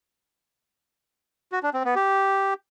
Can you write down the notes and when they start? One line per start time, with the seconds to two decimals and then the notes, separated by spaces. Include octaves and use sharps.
1.52 F#4
1.63 D4
1.74 C4
1.85 B3
1.95 G4